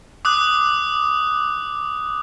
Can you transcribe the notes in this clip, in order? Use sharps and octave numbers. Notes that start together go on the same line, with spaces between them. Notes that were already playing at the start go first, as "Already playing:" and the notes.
D6 D#6 F#6